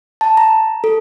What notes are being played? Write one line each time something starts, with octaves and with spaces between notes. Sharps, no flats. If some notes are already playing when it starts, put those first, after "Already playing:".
A5
A#5
A4